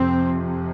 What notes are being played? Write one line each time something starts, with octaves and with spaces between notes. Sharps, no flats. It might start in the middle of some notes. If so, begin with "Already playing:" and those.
Already playing: F2 C3 C4